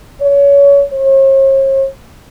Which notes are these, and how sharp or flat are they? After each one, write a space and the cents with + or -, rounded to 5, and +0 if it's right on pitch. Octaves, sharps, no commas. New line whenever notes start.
C#5 +25
C#5 -45